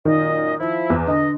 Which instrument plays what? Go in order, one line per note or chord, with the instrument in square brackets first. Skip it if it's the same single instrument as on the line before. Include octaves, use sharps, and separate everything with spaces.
[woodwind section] F#2 A#2 D#5 [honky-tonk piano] D#3
[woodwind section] F3 E4
[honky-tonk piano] E2
[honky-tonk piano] D3 [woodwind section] D#5